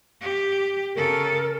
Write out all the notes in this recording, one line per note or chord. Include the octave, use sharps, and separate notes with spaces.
G4
C#3 A4 A#4